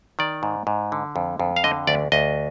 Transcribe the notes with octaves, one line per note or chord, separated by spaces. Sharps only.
D#3 D5
G#2
G#2
D3
F2
F2
F5
D3 D#5
D2 D5
D2 D#5